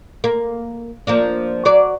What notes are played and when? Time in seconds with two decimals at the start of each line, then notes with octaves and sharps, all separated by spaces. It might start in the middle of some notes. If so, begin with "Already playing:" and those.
0.24 A#3
1.07 F3 A#3 D4
1.65 F#3 D5